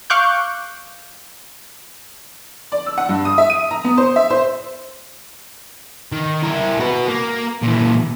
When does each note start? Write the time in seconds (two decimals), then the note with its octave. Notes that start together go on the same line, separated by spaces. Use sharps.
0.10 F5 C#6 D6 F#6 G6
2.72 D5
2.86 E6
2.98 F#5
3.09 G2
3.25 D#6
3.38 E5
3.50 D#7
3.71 A#5
3.84 B3
3.98 C5
4.16 E5
4.30 C5
6.12 D#3
6.43 E4 A#4
6.80 F#4 B4
7.07 A#3
7.63 A#2 E3